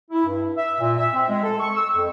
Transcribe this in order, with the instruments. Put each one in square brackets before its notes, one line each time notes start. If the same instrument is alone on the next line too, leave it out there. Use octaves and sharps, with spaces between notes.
[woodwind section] E4
G2
E5
A#2
E5
C4
G#3
A4
C#6
E6
F2